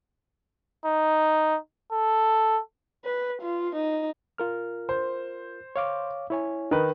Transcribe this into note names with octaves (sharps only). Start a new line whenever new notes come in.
D#4
A4
B4
F4
D#4
F4 A#4 F6
C5
C#5 F5 D6
E4 C#5 G#5
D#3 D#4 B4